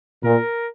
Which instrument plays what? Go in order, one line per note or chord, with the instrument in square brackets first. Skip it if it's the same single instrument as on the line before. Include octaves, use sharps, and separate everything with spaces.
[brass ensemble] A#2 [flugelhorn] A#4